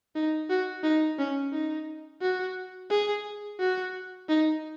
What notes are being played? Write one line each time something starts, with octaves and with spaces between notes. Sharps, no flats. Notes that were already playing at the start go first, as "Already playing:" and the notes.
D#4
F#4
D#4
C#4
D#4
F#4
G#4
F#4
D#4